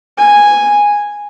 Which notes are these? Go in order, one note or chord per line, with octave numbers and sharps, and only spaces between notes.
G#5